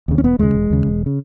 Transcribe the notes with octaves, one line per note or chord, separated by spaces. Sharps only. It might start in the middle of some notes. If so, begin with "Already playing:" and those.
D#2 C#3
C#4
E1 B3
D#2 C#3 G#3
E1
D#2 C#3
E1
C#3